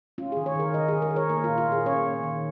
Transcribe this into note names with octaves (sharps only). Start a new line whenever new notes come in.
C#4 F4
D#3 G#4
C#5
D#3 A#4
D#3 D#5
D#3 G#4
A#4
D#3
C#5
A#3 A#4
A#2 F4
F4
A#2 G#4
C#4 C#5
C#4
D#3